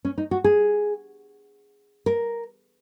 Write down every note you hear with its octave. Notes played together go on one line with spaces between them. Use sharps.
C#4
D#4
F#4
G#4
A#4